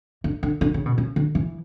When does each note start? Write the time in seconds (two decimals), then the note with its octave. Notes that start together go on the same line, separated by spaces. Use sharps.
0.24 D3
0.43 D3
0.61 D3
0.74 C#3
0.86 B2
0.98 C#3
1.16 D3
1.35 E3